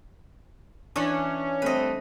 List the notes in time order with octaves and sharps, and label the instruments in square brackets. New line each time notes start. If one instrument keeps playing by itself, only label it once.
[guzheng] E3 D4 [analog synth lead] C#4
[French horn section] G3 A3 C4 [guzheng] B4 D#5